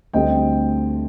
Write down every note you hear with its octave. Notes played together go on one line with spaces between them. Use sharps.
D2 D3 G3 C4 D#5 G5